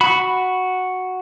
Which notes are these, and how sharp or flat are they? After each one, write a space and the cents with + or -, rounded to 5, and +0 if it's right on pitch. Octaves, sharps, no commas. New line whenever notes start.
F#4 +0 B5 +0